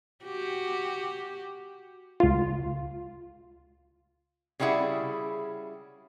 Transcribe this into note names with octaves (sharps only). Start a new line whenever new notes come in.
F#4 G4
C#2 F4
C#3 G3 B3 E4 G#4 F#5